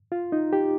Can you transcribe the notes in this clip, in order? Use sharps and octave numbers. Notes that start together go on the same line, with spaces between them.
F4
D#4
G4